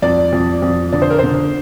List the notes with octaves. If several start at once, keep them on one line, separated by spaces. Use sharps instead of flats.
F2 D5
F2
F2
D3 D5
C5
A#4
D3 C5